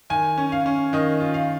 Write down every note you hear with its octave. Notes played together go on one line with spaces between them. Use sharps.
D#3 G#5
C#4
F5
C#4
D#3 D#5
F4
F5